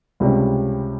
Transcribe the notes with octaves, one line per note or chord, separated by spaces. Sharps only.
C#2 C3 G3 C#4